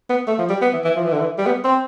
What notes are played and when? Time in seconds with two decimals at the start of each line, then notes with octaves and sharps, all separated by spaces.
0.10 B3
0.27 A3
0.39 F3
0.49 G3
0.62 B3
0.73 E3
0.84 E3
0.96 F3
1.04 E3
1.12 D3
1.21 E3
1.38 G3
1.46 B3
1.64 C4